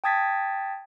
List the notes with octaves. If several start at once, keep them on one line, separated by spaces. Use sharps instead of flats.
G5 A5 D#6 G#6 A6 B6